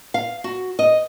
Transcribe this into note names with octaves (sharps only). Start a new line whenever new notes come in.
F5
F#4
D#5